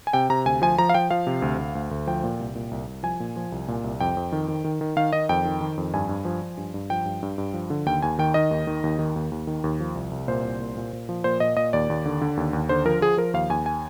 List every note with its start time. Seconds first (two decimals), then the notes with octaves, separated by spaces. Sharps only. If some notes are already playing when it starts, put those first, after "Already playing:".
0.07 G#5
0.13 C3 G5
0.30 C3 A#5
0.45 D2 G#5
0.62 F3 G#5
0.78 F3 A#5
0.89 F5
0.94 F3 G5
1.10 F3 F5
1.27 C3
1.42 D2
1.58 D2
1.75 D2
1.91 D2
2.07 F3 G5
2.24 A#2
2.39 C2
2.55 A#2
2.71 C2
2.87 C2
3.03 F3 G#5
3.20 A#2
3.36 F3
3.52 C2
3.68 A#2
3.84 C2
4.00 F2 G5
4.17 F2
4.32 D#3
4.48 D#3
4.64 D#3
4.81 D#3
4.97 D#3 F5
5.13 D#3 D#5
5.29 F2 G5
5.45 D#3
5.61 D#3
5.77 F2
5.94 G2 G#5
6.09 G2
6.25 F3
6.42 F3
6.57 G2
6.74 G2
6.90 F3 G5
7.06 G2
7.23 G2
7.38 G2
7.54 F3
7.70 D3
7.86 D#2 G5
8.02 D#2 G#5
8.19 D#3 G5
8.34 D#3 D#5
8.51 D#2
8.67 D#3
8.84 D#2
8.99 D#3
9.16 D#2
9.32 D#2
9.47 D#3
9.64 D#2
9.80 F3
9.95 C2
10.11 C2
10.28 A#2 C5
10.45 C2
10.60 A#2
10.77 A#2
10.93 A#2
11.09 F3
11.24 A#2 C5
11.40 A#2 D#5
11.57 A#2 D#5
11.73 D#2 D5
11.90 D#2
12.06 D3
12.21 D3
12.37 D#2
12.53 D#2
12.69 D3 C5
12.85 F3 A#4
13.01 F3 G#4
13.17 F3 A#4
13.34 D#2 F5
13.49 D#2 G#5
13.66 G#5